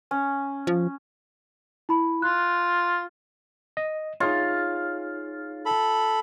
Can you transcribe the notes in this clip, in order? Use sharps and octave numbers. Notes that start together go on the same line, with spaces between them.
C#4
F3
E4 B5
F4 F#6
D#5
D#4 F4 G#4 C#5
A4 B5